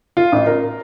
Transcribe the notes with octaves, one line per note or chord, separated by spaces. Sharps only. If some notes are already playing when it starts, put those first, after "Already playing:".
F4
A1
A#4